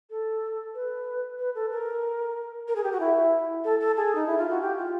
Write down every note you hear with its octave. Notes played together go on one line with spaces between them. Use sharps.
A4
B4
B4
A4
A#4
A#4
G#4
G4
F#4
E4
A4
A4
G#4
D#4
E4
F4
F#4
G4
F4